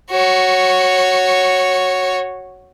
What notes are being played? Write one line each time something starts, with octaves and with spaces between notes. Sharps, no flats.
F#4 C#5